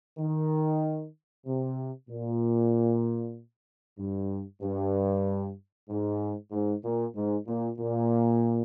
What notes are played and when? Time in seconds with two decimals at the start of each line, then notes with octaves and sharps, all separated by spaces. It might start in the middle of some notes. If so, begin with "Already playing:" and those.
0.19 D#3
1.46 C3
2.09 A#2
3.98 G2
4.62 G2
5.89 G#2
6.52 G#2
6.84 A#2
7.15 G#2
7.47 A#2
7.78 A#2